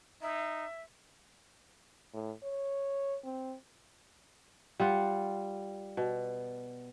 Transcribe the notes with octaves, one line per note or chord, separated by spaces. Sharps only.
D#4 E5
A2
C#5
C4
G3 F4 F#5
B2